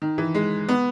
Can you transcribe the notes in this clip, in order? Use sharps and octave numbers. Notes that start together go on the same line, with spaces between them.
D#3
E3
G#3
B3